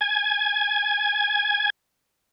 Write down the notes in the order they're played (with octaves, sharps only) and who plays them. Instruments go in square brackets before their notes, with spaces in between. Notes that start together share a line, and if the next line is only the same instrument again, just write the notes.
[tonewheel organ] G#5 G#6